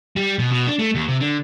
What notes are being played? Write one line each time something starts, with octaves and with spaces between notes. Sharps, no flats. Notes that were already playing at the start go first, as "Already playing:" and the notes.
G3
B2
B2
D4
A3
D#2
C3
D3